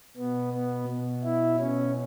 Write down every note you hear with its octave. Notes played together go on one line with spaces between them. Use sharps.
B2 B3
B3
B2
E4
B2 C#4